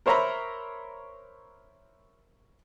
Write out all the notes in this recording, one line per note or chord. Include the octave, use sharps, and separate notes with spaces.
A#4 C5 C#5 E5 A#5 B5